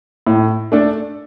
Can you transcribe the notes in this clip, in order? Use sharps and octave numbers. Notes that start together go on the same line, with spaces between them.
A2
A3 D4 A4